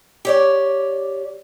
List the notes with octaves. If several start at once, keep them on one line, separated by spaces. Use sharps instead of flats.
G4 C#5 D5